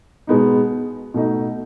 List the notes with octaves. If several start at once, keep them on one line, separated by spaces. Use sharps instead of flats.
B2 G#3 B3 D#4
B2 A3 D#4